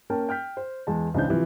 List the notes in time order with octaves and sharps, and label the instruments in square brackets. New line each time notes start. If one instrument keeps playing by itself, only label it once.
[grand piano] A#3 C#4 A#4 G5 A5
G5 F6 G6 B6
C5
E2 G#3 A5
C#2 C#3 E3 D4 C5 G6
C3 E3 F3